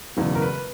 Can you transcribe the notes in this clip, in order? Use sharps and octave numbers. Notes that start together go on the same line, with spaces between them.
E1 E2 C#3 F#3
A#4
B4